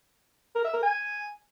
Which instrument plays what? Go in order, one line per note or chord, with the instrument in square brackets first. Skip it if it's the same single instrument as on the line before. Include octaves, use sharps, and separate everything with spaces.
[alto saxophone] A#4
E5
A#4
G#5